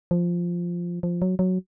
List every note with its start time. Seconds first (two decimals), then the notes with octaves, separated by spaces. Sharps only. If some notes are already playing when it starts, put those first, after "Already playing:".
0.11 F3
1.03 F3
1.22 F#3
1.39 F#3